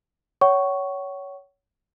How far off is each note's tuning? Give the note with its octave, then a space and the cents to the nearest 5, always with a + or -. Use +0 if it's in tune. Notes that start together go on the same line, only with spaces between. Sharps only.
C#5 +15 F#5 +40 C#6 +0